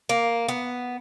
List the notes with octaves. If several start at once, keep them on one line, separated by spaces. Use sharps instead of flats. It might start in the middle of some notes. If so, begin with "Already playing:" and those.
A#3
B3